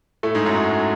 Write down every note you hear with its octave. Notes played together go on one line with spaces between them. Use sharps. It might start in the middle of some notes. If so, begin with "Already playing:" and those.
A2 A3
G#2 G#3
F#2 F#3